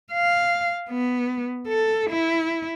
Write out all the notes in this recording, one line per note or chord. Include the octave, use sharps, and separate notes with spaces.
F5
B3
A4
E4